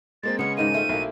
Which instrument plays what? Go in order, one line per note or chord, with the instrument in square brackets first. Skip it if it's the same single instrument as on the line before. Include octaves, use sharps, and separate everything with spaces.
[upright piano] G#3 A#3 C4 [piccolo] A6
[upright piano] C#3 G#3 [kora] B3 C#4 [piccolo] C#7
[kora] G#2 D#3 A#3 [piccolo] D#7
[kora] A3 C4 F4
[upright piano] B1 [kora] A#3 E4